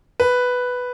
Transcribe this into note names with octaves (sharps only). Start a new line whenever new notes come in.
B4